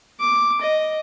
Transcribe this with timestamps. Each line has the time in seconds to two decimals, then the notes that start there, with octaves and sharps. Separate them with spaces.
0.20 D6
0.61 D#5